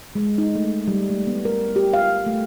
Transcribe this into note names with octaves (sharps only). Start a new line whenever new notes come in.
G#3
D#4
A3
G3
A3
B3
A#4
G4
F5
A3